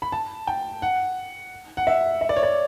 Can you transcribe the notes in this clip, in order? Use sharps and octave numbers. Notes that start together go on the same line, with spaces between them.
B5
A5
G5
F#5
F#5
E5
E5
D5
C#5
D5